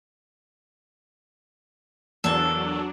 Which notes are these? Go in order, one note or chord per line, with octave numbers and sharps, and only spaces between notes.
E2 F#3 A#3 D4 A4